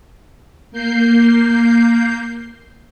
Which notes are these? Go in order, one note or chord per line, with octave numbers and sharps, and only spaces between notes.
A#3 G6 C7